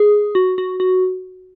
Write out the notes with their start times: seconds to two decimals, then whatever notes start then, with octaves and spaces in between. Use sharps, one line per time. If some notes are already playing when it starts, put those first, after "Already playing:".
Already playing: G#4
0.35 F#4
0.58 F#4
0.80 F#4